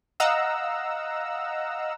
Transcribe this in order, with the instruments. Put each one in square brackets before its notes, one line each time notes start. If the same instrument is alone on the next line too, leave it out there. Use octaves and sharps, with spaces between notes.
[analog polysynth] D#5 F5 F#5 A#5 E6